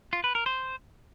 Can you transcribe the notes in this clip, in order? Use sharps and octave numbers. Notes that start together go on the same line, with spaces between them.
F4
B4
A#4
C5